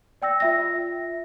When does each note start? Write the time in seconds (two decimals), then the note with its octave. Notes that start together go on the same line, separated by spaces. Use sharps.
0.22 D5 G5 E6 A#6
0.40 F4 E5 A#6